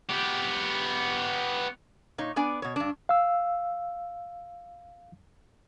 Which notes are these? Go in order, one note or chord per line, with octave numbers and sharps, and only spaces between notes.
B3 G4
A#2 D#4 C#5
B3 D4 D5 G#5
B2 C#5
G2 D4
F5 E6